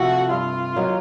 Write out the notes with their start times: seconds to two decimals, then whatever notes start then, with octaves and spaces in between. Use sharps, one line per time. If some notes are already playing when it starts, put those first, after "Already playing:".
Already playing: C3 F3 A3 F#4
0.30 G2 F4
0.76 D#3 F#3 A#3